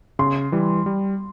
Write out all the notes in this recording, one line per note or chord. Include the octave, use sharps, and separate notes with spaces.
C#3 C6
E3 G3
G3